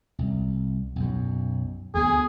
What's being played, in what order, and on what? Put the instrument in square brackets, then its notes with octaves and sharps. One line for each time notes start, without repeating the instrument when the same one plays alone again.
[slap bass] C2
B1 F#2
[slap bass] D2 B3 [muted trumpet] G#4